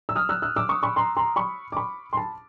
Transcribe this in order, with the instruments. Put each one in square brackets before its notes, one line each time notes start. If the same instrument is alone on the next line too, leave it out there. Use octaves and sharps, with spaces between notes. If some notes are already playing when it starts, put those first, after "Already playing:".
[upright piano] E6
D#6 F6
E6 F#6
E6 F#6
D6 E6
C#6 D#6
B5 C#6
A#5 C6
A#5 C6
B5 C#6
D6
B5 C#6
C6
A5 B5